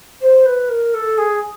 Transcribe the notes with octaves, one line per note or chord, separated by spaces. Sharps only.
C5
B4
A#4
A4
G#4